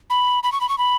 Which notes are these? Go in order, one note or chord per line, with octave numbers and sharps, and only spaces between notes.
B5
B5
C#6
B5
C#6
B5